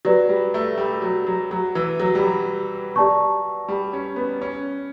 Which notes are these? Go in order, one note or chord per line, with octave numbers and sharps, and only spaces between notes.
F#3 G4 B4 D5
G3
A3
G3
F#3
F#3
F#3
E3
F#3
G3
F#3
G4 D5 A5 C#6
G3
C#4
B3
C#4